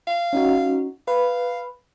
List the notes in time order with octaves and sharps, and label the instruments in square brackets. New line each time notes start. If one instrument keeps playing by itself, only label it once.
[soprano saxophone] F5
[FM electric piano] C#4 D#4 F#4
[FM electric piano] B4 [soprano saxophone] F5